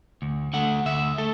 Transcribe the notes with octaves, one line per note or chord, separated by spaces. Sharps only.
D2
D3 A3 F#5
D2 E5
A3 A4